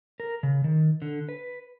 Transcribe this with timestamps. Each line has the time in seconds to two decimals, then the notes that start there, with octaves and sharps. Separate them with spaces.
0.20 A#4
0.43 C#3
0.64 D#3
1.02 D3
1.29 B4